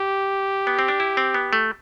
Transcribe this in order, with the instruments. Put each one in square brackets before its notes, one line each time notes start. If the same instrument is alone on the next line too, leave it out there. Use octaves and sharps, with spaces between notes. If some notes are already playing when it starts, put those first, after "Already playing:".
Already playing: [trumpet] G4
[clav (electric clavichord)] B3
C4
D4
E4
C4
B3
A3